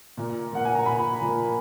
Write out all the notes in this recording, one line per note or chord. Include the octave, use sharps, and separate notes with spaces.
A#2
F3 A#3 F#5
G#5
A#5
A#2 B5
F3 A#3